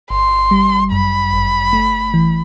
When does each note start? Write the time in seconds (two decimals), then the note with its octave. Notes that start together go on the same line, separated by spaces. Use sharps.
0.10 G1 C6
0.51 G3
0.92 F#2 B5
1.33 G1
1.73 A3
2.14 E3